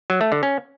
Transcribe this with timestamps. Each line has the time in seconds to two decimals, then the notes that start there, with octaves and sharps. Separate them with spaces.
0.10 F#3
0.21 A3
0.32 D3
0.43 C#4